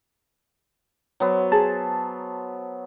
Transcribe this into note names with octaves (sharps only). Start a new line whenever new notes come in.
F#3 B3 C5
G#4 A5